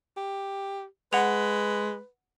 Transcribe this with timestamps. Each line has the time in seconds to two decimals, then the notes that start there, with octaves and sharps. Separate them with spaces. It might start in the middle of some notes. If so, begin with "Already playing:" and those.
0.16 G4
1.13 G#3 B4 F#5 F7